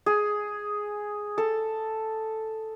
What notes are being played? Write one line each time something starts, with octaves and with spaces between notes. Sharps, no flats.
G#4
A4